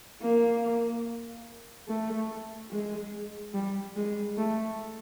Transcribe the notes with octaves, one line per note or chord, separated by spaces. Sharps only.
A#3
A3
G#3
G3
G#3
A3